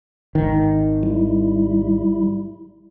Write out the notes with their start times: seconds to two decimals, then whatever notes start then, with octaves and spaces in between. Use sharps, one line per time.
0.35 G#1 D#3
1.03 G3 E4